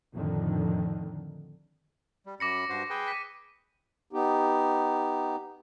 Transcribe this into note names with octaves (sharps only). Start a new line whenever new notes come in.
F2 A2 D3 D#3
G3
F#2 B5 D6 A#6 C#7
G2 F#4 C5
G#4 B4 G5
B6 D#7
B3 D#4 G4